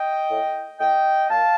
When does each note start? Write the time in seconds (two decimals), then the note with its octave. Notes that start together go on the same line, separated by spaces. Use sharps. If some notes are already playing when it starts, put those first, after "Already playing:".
Already playing: D#5 G5
0.30 A2
0.79 A2 D#5 G5
1.30 A#2 F5 A5